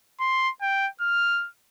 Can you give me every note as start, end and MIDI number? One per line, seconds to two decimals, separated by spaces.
0.20 0.50 84
0.61 0.88 79
1.01 1.48 89